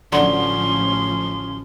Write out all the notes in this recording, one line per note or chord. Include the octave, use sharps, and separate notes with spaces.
A1 D3 F3 F#3 C#4 C6